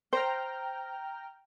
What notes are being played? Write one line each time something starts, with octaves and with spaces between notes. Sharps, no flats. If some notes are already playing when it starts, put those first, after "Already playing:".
C5 G5 A#5 F6